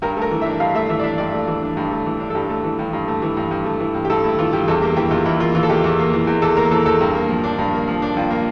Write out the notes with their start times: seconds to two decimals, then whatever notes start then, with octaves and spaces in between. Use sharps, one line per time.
0.02 G2 A#4
0.17 A3 A#4
0.31 E3
0.41 E5
0.46 D4
0.60 G2 F5
0.74 A3 E5
0.89 E3 E5
0.99 D5
1.04 D4 E5
1.18 G2 D5
1.33 A3
1.48 E3
1.62 D4
1.77 G2
1.91 A3
2.06 E3
2.20 D4
2.30 A4
2.35 G2 G4
2.50 A3
2.64 E3
2.79 G2
2.93 G2
3.08 A3
3.22 E3
3.37 G2
3.51 G2
3.65 A3
3.80 E3
3.94 G2
4.05 G4
4.10 G2 A4
4.24 A3 E4
4.39 E3 F4
4.53 G2 G4
4.68 E2 A4
4.82 A#3 G4
4.96 E3 G4
5.11 E2 F4
5.25 E2 E4
5.40 A#3 F4
5.55 E3 F4
5.63 A4
5.69 E2 G4
5.84 E2
5.99 A#3
6.13 E3
6.27 E2
6.42 E2 A4
6.57 A#3 A#4
6.71 E3 A4
6.86 E2 A4
7.01 G2
7.15 A#3
7.29 F3
7.43 D4
7.58 G2
7.73 A#3
7.88 F3
8.02 D4
8.17 G2 F4
8.30 A#3